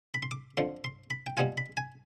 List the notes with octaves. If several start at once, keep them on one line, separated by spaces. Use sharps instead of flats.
B5
C6
D6
F2 D3 F3 C6
C6
B5
G5
B2 G3 B3 F4 G#5
B5
G#5